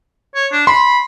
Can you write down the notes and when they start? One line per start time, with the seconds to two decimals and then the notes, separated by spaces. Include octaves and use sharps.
0.35 C#5
0.52 D4
0.67 B5 C6